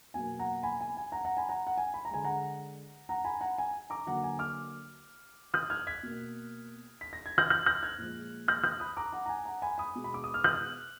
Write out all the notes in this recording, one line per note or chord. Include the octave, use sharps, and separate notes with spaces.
B2 F#3 A#3 G#5
F#5 A#5
G#5 B5
G#5
G#5
F#5 A#5
F#5 A#5
G#5 B5
F#5 A#5
F#5
G#5
B5
A#5
D3 G#3 G#5
F#5 A#5
F#5 A#5
G#5 B5
F#5 A#5
G#5
A#5 D6
D3 F#3 A#3 F#5 A#5
G#5
D6 F6
D#6 F#6
F6 G#6
G#6 B6
B2 A#3
B6
A#6
G#6
F#6 A#6
F#6 A#6
F#6 A#6
F6 G#6
A#2 F3 G#3
F#6 A#6
D#6 F#6
B5 D#6
A#5 D6
F#5 A#5
A#5
G#5
F#5 A#5
G#5 B5
B5 D#6
B2 G#3
B5
D6
D#6
F6
D#6 F#6